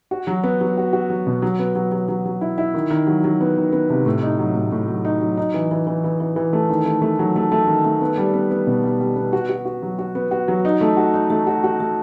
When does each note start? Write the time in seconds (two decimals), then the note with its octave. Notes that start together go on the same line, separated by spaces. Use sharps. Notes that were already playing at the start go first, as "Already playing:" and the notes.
0.11 F#4
0.27 F#3
0.43 B3
0.61 F#3
0.77 F#4
0.93 F#4
1.10 F#3
1.27 B2
1.42 F#3
1.59 B3
1.75 F#3
1.92 F#3
2.08 F#3
2.25 F#3
2.41 E4
2.58 E4
2.74 D#3
2.91 D#3
3.07 F#3
3.24 F#3
3.41 B3
3.57 D#3
3.72 B3
3.90 C3
4.06 A2
4.22 D#4
4.39 F#3
4.55 A2
4.72 A2
4.88 F#3
5.05 D#4
5.21 F#3
5.37 D#4
5.54 E3
5.71 E3
5.87 E3
6.04 E3
6.20 E3
6.36 E3
6.53 A3
6.69 D#3
6.86 A3
7.02 A3
7.19 F#3
7.36 A3
7.52 A3
7.68 D#3
7.85 A3
8.01 B3
8.18 G3
8.33 B3
8.51 B3
8.67 B2
8.84 G3
9.00 G3
9.16 B3
9.33 F#4
9.49 F#4
9.66 F#4
9.82 F#3
9.99 F#4
10.15 B3
10.31 F#4
10.48 F#3
10.65 D#4
10.81 A3
10.97 F#4
11.14 D#4
11.30 A3
11.47 F#4
11.64 F#4
11.80 A3